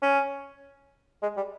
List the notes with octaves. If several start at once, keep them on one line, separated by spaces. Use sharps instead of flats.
C#4
G#3
G3